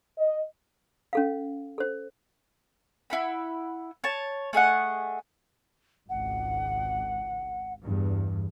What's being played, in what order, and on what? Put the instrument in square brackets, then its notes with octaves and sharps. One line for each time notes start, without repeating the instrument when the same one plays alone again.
[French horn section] D#5
[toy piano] C#4 A4 F5
A4 C5
[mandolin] E4 F#5 B5
C#5 A5
A3 G#4 D#5 F#5
[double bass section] G#1 C#2 [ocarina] F#5
[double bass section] E2 G2